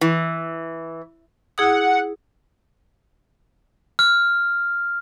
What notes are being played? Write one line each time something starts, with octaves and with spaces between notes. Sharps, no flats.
E3
E4 G#4 F#5 D#6
F6